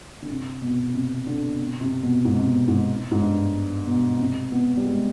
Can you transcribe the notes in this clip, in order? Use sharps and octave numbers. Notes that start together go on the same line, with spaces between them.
D3
C3
B2
C3
D3
B2
C3
B2
G#2
C3
B2
G#2
G#2
G2
B2
C3
B3
G3
G#3